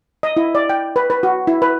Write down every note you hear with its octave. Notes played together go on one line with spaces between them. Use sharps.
D#5
E4
D5
G5
B4
B4
F#4
E4
B4